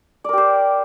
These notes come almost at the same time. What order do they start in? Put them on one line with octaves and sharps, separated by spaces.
D5 A#4 G4 C5